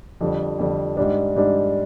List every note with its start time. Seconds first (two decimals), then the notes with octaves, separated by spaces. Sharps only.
0.21 F2 D3 G3
0.59 F2 D3 G3
0.97 G#2 G3 D4
1.36 G#2 G3 D4